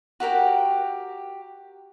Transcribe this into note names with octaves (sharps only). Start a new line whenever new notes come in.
F#4 G4 A#4 G5